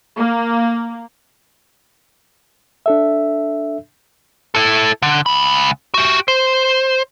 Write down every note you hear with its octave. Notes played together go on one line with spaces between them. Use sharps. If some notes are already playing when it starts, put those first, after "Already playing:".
A#3
D4 A4 E5
E4 A4
D3
C#2 B5
F#4 G4
C5